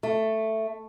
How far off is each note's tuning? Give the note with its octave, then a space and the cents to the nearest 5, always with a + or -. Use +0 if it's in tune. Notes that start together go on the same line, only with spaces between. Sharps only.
A3 +5